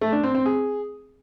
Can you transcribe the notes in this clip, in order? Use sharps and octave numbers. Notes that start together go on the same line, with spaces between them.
A3
D4
C4
C4
G#4